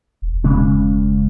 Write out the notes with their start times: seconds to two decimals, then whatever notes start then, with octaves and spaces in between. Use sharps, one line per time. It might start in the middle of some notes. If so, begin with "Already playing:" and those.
0.22 E1
0.44 C#3 G#3 C#4